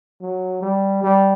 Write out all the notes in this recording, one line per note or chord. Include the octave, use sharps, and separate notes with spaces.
F#3
G3
G3